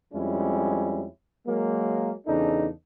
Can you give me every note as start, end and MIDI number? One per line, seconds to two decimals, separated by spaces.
0.13 1.04 41
0.13 1.04 55
0.13 1.04 56
0.13 1.04 61
0.13 1.04 64
1.46 2.11 54
1.46 2.11 56
1.46 2.11 58
2.27 2.67 40
2.27 2.67 49
2.27 2.67 62
2.27 2.67 63
2.27 2.67 69